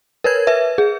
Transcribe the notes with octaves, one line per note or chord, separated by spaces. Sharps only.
A#4 B4 C#5 G#6
B4 E5
G#4